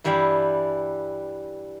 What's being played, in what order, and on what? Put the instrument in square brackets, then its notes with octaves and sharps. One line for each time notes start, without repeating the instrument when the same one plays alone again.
[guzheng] G2 E3 G3 E4 G4 F5